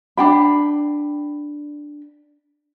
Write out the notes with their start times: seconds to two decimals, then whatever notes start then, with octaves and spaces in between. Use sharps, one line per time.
0.17 D4 G5 B5